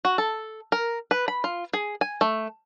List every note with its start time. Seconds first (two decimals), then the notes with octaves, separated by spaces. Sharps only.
0.05 F#4
0.18 A4
0.72 A#4
1.11 B4
1.28 B5
1.44 F4
1.73 G#4
2.01 G#5
2.21 A3